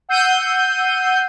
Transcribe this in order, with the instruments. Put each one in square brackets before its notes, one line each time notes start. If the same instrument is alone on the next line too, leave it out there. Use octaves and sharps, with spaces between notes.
[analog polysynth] F#5 E6 G6 C7 D#7